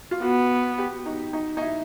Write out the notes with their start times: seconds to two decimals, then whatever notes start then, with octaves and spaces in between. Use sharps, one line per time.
0.11 F4
0.22 B3 F#4
0.78 G4
1.06 D#4
1.33 D#4
1.57 D#4
1.61 E4